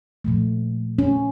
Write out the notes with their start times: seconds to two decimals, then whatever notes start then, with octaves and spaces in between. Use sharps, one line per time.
0.25 A#2 F3 A3
0.99 C#4